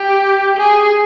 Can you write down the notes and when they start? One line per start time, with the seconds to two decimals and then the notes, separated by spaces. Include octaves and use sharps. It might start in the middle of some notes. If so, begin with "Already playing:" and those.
Already playing: G4
0.57 G#4